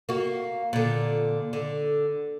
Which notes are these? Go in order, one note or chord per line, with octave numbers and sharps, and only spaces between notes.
A#3 F#4
A#2 D3
D3